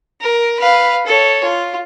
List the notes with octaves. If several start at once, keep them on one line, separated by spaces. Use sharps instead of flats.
A#4
B4 F5
A4 C#5
F4